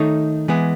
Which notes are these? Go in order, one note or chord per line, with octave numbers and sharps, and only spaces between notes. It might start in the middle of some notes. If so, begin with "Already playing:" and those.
Already playing: D#3 A3 D#4 A4 C#5
E3 G#3 B3